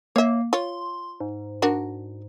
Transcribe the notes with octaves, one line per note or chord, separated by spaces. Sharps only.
A#3 C#5 E5
F4 C#5 C6
G#2
D4 F#4 A#4